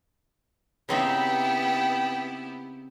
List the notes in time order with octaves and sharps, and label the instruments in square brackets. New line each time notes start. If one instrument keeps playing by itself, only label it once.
[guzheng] C#3 C4 D#4 [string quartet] B3 E4 G4 [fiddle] B4 G5